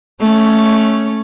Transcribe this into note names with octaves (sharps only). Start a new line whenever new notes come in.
A3 C#4 C#5